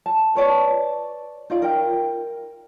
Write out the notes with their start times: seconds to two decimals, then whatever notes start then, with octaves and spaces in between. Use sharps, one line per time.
0.06 A5
0.35 B4 C#5 D5 A5
1.50 D#4 F4 D5
1.62 A#4 G5